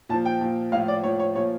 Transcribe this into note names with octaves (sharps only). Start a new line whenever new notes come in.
A#2 F3 A5
G5
A#2 F3
A2 F3 F5
D5
A2 F3 C#5
C#5
A#2 F3 C#5